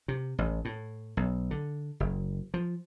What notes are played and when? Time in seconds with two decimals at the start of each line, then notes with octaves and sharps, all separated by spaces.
0.08 C3
0.38 A1
0.65 A2
1.17 B1
1.51 D3
2.00 F#1
2.54 F3